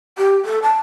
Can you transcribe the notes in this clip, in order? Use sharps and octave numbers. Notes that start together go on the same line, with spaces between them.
G4
A4
A5